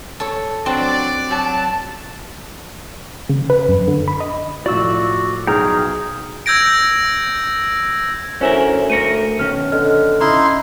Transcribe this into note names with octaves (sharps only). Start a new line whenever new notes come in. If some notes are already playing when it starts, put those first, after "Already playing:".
A4 C#5
F#3 C4 D4 D5
F#3 A5
C#3
B4
F#2
D3
B5
D#5
A2 F3 F4 F#4 D5 E6
B1 B2 G#4 G5 A#5 F6
E6 G6 G#6 A#6 D7
D2 C#4 E4 A#4 C5 C#5 G#5
A3 A#4 A#6 C#7 D#7
B2 D#3 C#4 F6
D3 D#5 F6
C#3 D#4 E4 C6